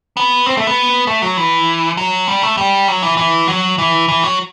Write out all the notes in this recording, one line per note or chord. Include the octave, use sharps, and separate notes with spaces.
B3
C4
A3
B3
A3
F#3
E3
F#3
G3
A3
G3
F#3
E3
E3
F#3
E3
E3
F#3